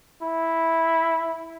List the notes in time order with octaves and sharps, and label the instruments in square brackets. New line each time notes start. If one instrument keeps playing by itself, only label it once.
[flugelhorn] E4